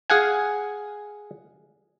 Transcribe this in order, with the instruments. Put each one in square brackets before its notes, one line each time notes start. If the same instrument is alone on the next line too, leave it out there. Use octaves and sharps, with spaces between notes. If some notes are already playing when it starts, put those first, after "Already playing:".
[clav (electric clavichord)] G#4 F5 F#5 G#5